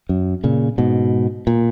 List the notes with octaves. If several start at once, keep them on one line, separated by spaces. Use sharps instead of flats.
F#2
A#2 C#3
G#2 B2
A#2